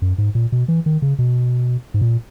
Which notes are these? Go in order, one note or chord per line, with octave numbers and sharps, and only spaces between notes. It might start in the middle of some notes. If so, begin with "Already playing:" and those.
F#2
G#2
A#2
B2
E3
D#3
C#3
B2
G#2
A#2